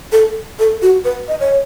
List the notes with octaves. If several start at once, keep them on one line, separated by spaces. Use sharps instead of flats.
A4
A4
F#4
B4
D#5
C#5